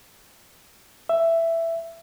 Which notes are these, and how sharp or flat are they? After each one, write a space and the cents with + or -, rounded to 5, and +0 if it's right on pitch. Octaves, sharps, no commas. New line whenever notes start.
E5 +10